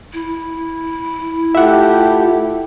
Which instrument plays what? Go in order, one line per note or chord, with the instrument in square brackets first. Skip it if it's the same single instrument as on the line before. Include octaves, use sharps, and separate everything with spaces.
[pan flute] E4
[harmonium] A3 G4 [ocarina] F4 [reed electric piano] E5 F#5